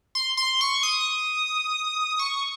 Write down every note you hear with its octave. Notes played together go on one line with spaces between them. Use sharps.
C6
C6
C#6
D#6
C#6